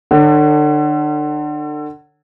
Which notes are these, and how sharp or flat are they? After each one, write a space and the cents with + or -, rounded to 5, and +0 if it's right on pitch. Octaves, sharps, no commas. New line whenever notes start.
D3 +35 A4 +30 C#5 +5